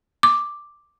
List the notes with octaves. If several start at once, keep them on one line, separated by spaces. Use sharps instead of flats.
D6